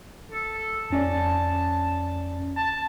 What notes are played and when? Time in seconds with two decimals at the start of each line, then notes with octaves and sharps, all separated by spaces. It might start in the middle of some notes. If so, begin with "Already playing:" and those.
0.32 A4
0.90 F2 C#4 D5 A5
2.57 A5